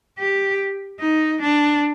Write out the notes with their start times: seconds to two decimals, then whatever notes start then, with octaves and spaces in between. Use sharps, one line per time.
0.19 G4
1.00 D#4
1.41 D4